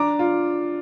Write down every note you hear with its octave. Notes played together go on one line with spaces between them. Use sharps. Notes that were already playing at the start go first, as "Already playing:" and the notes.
Already playing: D4 A#5 D6
F4